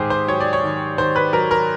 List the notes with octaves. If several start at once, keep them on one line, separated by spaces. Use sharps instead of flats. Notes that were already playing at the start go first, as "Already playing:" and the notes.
Already playing: G#2 D#3 G4 G#4 C5
C5
F#3 C#5
D5
C#5
D#3
D#3 C5
B4
F#3 A#4
A#4